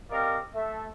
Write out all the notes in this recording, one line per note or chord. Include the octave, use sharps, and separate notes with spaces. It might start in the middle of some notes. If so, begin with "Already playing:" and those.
C4 G4 A#4 D5 D#5 F5
A3 A4 E5